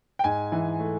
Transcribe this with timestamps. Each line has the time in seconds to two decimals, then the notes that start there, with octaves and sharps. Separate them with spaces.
0.19 G5
0.24 G#2 G#5
0.52 E3
0.79 A3